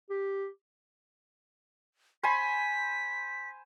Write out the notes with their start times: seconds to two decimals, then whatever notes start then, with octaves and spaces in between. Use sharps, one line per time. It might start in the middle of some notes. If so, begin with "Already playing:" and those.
0.10 G4
2.23 C5 G#5 B5 B6